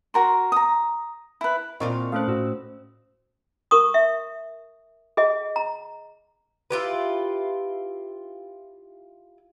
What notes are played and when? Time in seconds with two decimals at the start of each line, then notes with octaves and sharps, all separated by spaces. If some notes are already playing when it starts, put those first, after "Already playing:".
0.14 F#4 A#4 C6
0.52 A#5 D#6
1.41 E4 B4
1.80 A#2 C4 D4 E4 F4 A#4 D#5 C#6
2.12 A3 C#4 A4 C5 F5 F#6
2.28 A2 F#4 E6
3.71 A#4 C#6 D#6
3.94 E5
5.17 G#4 D#5
5.56 A#5
6.71 E4 F4 G4 B4